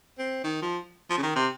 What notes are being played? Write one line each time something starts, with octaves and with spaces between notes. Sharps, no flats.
C4
D#3
F3
F3
C#3
D#3
C3